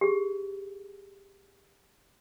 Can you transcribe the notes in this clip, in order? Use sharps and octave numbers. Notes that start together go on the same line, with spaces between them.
G4 G#4